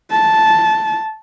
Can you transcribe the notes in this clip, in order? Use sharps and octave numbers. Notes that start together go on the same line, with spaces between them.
A5